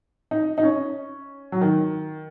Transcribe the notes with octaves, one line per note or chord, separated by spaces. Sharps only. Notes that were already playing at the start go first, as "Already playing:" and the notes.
D#4
D#4
C#4
F#3
D#3